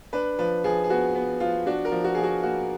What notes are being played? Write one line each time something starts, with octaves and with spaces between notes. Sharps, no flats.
D4 B4
F3 B4
F3 G#4
G#4
B3 F#4
B3
F3 F4
D4 F#4
A#4
F3
F#4
F3 G#4
F#4
A#3 F#4